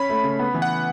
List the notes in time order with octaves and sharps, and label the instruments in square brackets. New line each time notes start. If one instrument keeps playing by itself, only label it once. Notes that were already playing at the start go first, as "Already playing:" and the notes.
Already playing: [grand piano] C#4 [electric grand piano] B5
[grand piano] A3
C#3
B3
E3
[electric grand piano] F#5